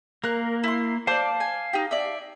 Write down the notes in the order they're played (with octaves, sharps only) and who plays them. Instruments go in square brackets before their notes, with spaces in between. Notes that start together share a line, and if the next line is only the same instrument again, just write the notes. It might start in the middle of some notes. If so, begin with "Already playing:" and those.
[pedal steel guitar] A#3 [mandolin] A#4 F#6
[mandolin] E4 C6
[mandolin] C5 D5 [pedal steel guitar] F5 A5 D6
[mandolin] G#5
D#4 G4
D5 E5